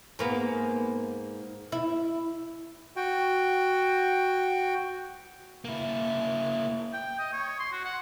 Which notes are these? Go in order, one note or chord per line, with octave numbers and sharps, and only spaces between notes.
G#2 A#3 B3
E4
F#4 G5
A#3 E4
G5
D#5
C#5
C6
F#4
F#5